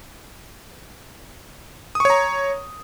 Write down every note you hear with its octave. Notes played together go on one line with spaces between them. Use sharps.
C#5 A#5 C#6 D#6